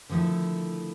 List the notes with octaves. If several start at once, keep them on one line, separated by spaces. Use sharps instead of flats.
D3 D#3 F3 A3 E4